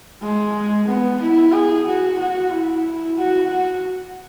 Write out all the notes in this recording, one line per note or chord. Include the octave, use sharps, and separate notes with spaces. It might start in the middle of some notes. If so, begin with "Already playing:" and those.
G#3
B3
E4
G#4
F#4
F#4
E4
F#4
F#4